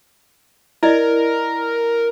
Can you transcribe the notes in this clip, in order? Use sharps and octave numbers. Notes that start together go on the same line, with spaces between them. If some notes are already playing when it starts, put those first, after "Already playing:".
E4 A#4 D5 D#5